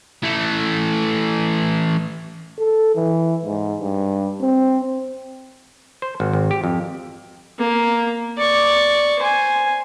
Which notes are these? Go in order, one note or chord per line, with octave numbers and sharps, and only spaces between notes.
E3 A3
A4
E3
G#2
G2
C4
C5
G#1
G#1
G4
F2
A#3
D5 C#6
C5 G#5